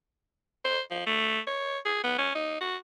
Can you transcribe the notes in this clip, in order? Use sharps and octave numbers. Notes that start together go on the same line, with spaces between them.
C5
F3
A3
C#5
G#4
B3
C#4
D#4
F#4